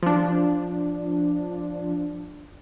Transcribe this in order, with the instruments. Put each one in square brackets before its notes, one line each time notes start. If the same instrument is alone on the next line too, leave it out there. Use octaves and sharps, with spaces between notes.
[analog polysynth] F3 D4